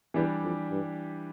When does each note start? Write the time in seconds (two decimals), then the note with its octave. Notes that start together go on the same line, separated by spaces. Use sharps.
0.14 E2 E3 G3 D4 G4
0.43 F2
0.71 G2